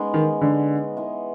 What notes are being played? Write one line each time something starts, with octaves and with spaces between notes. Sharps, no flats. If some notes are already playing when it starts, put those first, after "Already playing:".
Already playing: G#3 B3 C#4 D#4
D#3
D3
E3 G#3 B3